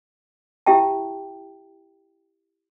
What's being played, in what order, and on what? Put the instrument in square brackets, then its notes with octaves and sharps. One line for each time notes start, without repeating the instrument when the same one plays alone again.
[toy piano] E4 G4 E5 G5 A5